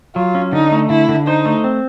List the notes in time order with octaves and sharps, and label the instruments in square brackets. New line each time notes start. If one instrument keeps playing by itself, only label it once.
[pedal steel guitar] F#3 [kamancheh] F4
[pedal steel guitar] C#4
[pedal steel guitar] D3 [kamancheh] D#4
[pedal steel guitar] A3
[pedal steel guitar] D3 [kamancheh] E4
[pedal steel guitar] D3
[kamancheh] D#4 [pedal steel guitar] C5
[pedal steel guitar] A3
C4